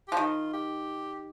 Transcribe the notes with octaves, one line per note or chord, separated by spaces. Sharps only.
F3 G4
D#3 F4
G4